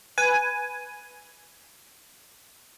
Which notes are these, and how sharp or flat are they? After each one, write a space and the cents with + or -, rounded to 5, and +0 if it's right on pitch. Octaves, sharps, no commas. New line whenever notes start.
B4 +0 G#5 +5